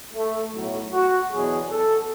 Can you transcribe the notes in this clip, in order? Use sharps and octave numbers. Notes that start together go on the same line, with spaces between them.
A3
B1 A2 F#3
F#4
E2 B2 F#3 G#4
A4